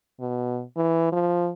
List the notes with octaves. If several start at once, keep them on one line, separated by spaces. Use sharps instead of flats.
B2
E3
F3